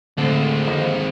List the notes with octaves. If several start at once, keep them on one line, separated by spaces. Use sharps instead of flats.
A2 D3 G#3 A3 C4 A4
D#2 D#3 F3 D#4